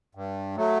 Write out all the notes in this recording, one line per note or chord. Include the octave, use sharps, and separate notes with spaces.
G2
F#3 A3